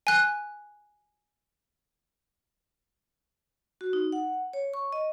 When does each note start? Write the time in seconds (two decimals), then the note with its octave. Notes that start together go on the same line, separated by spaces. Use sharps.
0.07 G#5 F#6
3.81 F#4
3.93 D#4
4.12 F#5
4.53 C#5
4.74 C#6
4.93 D#5